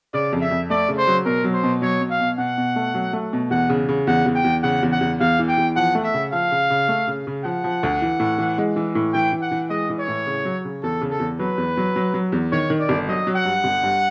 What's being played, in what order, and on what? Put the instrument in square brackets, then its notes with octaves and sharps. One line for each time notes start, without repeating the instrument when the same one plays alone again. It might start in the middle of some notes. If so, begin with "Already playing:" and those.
[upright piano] C#3 [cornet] D5
[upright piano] F2
[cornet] E5
[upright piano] F2
[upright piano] A3 [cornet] D5
[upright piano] C#3
[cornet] C5
[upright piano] F#3
[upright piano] B2 [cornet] A#4
[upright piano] F#3
[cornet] C5
[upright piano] B2
[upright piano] F#3 [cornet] C#5
[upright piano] B2
[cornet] F5
[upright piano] B2
[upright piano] B2 [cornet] F#5
[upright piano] B2
A3
F#3
A3
B2
[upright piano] E2 [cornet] F#5
[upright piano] C#3
C#3
[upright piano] E2 [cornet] F#5
[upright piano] E2
[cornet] G5
[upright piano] E2
[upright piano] C#3 [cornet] F#5
[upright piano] E2
[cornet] F#5
[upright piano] E2
[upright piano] E2 [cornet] F5
[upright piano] E3
[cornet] G5
[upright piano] E2
[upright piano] F3 [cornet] F#5
[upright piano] A3
[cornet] E5
[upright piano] C#3
[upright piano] F3 [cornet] F5
[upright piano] C#3
C#3
A3
C#3
C#3
[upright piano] F3 [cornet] F#5
[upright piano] F3
D2
E3
A2
E3
G#3
E3
A2
[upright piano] E3 [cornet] G5
[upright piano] E3
[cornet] F#5
[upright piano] E3
[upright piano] G#3 [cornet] D#5
[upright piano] E3
[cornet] C#5
[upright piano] A2
C#3
F#3
C#3
[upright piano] E2 [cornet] A4
[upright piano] C#3
[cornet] A4
[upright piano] E2
[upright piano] F#3 [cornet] B4
[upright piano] E2
F#3
F#3
F#3
E2
[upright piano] D#3 [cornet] C#5
[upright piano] D#3
[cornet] D5
[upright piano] G1
[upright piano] F#3 [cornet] D#5
[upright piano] F#3
[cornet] F#5
[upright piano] G2
G1
G2